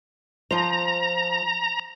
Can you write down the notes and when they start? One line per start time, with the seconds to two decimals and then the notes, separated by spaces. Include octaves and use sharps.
0.51 F3 C5 A#5